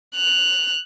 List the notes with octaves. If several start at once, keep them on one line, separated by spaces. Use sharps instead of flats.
F#6 F7